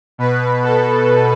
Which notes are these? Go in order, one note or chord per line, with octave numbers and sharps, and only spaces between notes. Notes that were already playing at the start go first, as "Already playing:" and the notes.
B2 B4
A4